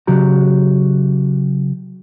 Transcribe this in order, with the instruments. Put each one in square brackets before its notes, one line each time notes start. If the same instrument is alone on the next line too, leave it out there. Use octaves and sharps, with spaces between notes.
[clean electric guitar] C#3 F#3 F#4 G4 A#5